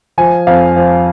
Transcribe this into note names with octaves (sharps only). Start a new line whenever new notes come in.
F3 G#5
F2 F5
F3